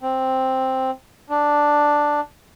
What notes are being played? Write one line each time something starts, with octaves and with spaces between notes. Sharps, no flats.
C4
D4